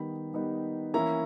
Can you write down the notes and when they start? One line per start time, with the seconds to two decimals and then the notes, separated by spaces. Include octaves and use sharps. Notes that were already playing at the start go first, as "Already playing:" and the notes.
Already playing: D#3 G3 B3 D#4 B5
0.34 D#3 G3 B3 D#4
0.94 E3 A#3 C#4 E4 A#5